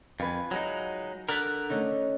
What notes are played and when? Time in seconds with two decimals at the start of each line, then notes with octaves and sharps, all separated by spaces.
0.20 F2 F4 B4 G#5
0.51 F#3 G#3 D#4
1.29 D3 A#4 F#6 A6 B6
1.70 A3 C#4 D#4